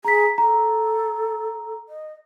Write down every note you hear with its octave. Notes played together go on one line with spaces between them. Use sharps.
G#4 A#5 B6
A4 A#5
D#5